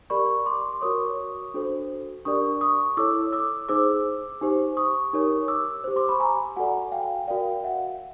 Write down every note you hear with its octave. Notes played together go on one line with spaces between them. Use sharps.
G4 A#4 D5 B5 C#6
C6 D6
D6
F#4 A#4 C#5 C#6 D#6
D4 F#4 A4 C5
D4 G4 A#4 D5 C#6 D#6
C#6 D#6
E4 A4 C#5 D6 E6
D6 E6
D#4 G#4 C5 D6 E6
D#4 G4 C5
C#6 D#6
D#4 G4 A#4 C#5
D6 E6
G4 C5
C6 D6
B5 C#6
G#5 A#5
F#4 A4 D5 F#5 G#5
F5 G5
F#4 A#4 D5 F5 G5
E5 F#5